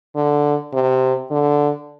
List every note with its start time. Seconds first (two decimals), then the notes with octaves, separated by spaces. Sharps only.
0.16 D3
0.74 C3
1.31 D3